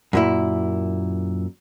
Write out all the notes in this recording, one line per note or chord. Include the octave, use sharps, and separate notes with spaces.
F#2 A#2 E4